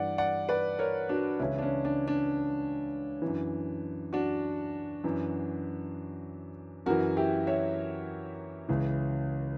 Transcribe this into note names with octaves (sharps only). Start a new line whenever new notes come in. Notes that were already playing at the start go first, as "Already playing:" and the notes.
Already playing: G2 E3 D5 F#5
D5 F#5
B4 D5
A#4 C#5
D4 F#4
C#2 C#3 E3 C#4 E4
D4
C#4
D4
D4
F#2 E3
D4 F#4
F#2 E3
F#2 E3 F#4 A#4
E4 G4
C#5 E5
C#2 C#3 E3